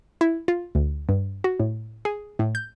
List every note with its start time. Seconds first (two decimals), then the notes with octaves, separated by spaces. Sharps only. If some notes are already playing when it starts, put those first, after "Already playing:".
0.21 E4
0.48 F4
0.75 D2
1.09 G2
1.44 F#4
1.60 A2
2.05 G#4
2.39 A2
2.55 G6